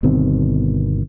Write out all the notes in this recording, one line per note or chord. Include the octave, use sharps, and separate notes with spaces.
G1 B2 D#3 C4